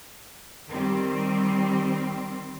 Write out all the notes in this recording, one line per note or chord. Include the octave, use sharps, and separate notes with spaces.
D#3 G3 C4